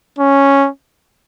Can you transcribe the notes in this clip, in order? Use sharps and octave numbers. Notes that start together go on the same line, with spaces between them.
C#4